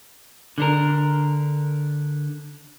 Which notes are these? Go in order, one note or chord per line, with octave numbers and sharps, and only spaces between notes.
D3 D4 A#4